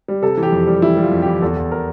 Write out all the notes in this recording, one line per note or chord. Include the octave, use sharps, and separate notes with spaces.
G3
C3 A4
E3
G4
F2
G3
E3 E4
G3
F4
F2
E3 G4
E2 A4
E2
A#4